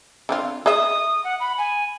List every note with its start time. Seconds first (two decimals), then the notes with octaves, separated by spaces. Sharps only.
0.29 D3 C4 F4
0.66 G#4 D#5 E5 D#6
1.24 F#5
1.40 B5
1.58 G#5